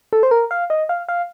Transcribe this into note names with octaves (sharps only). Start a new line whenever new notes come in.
A4
C5
A#4
F5
D#5
F5
F5